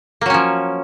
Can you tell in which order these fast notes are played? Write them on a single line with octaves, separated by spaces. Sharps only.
A#3 F#3 C#4 F3